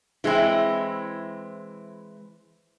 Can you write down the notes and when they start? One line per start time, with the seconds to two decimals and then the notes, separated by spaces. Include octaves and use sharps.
0.24 E3 G#3 A3 C4 E4